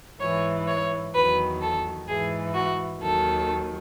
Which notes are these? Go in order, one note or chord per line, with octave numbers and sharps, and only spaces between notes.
G#2 E3 C#5
C#5
E2 D#3 F#3 B4
A4
G#2 E3 G#4
F#4
D#2 D#3 F#3 A4